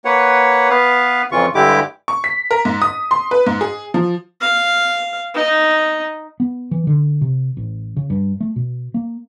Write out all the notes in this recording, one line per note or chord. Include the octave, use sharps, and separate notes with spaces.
A#3 B4 C#5 F#5
B3 B4 F5
F2 C#3 E3 F4 C#6
G2 D3 G#3 E4 G4 D6
C#6
B6
A#4
G#2
D#6
C6
B4
G#2
G#4
F3
F5
D#4
B3
E3
D3
C3
A1
C#3
G2
A3
B2
A#3